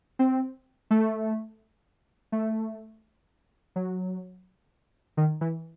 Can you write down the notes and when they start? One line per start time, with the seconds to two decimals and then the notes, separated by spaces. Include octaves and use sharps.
0.19 C4
0.91 A3
2.32 A3
3.76 F#3
5.17 D#3
5.41 E3